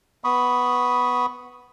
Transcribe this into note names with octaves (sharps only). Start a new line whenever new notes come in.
B3 B5 C#6 D#6